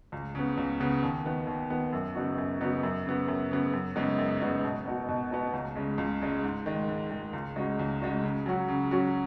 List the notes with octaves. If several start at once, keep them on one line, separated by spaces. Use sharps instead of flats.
C#2
C#3 B3
C#2
C#3 B3
D#2
D#3 B3
D#2
D#3 B3
F#2
C#3 B3 D#4 F#4
F#2
C#3 B3 D#4 F#4
F#2
C#3 B3
F#2
C#3 B3
F#2
C#3 G#3 B3 D#4
F#2
C#3 G#3 B3 D#4
B2
B3 D#4 F#4
B2
B3 D#4 F#4
C#2
C#3 G#3
C#2
C#3 G#3
G#2
D#3 G#3
G#2
D#3 G#3
C#2
C#3 G#3 D#4 F#4
C#2
C#3 G#3 D#4 F#4
C#3
F#3 C#4 F#4
C#3
F#3 C#4 F#4